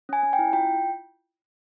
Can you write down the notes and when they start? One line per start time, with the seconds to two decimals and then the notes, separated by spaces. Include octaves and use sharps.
0.09 C#4 G#5
0.23 C#4
0.33 G5
0.39 E4
0.53 F4 G5